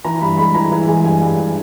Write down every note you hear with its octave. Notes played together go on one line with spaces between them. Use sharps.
E3 A#5
G2 B5
G#3 B5
E3 A#5
E3
G#3 G#5
G2 G#5
G2
E3